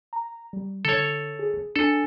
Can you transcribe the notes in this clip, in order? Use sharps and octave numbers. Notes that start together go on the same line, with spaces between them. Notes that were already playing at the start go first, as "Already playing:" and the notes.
A#5
G3
D3 A4 C#5
G#4
D4 A4 G#5